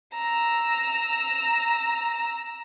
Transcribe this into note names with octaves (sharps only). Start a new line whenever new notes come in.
A#5 E6